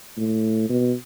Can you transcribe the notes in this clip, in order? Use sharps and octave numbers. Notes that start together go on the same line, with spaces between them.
A2
B2